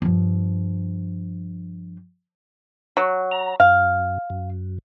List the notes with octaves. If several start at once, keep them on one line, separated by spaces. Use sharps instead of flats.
G2 F3
F#3
A#5
F#2 F5
F#2